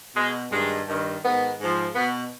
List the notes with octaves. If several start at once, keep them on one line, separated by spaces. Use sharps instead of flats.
B2 G#3
G2 D#3 G#3
G2 D#3
G#2 D#3 B3
G#2 F3
B2 B3